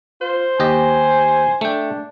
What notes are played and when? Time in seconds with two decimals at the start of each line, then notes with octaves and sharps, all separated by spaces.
0.21 F4 C5
0.60 D#2 G4 D#5 G#5
1.61 A3 D4 G5